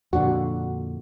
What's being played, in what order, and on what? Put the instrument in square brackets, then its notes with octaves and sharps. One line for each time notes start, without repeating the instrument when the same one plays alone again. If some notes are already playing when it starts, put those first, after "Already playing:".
[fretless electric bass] F2 A#2 D3 [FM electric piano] D4 F#4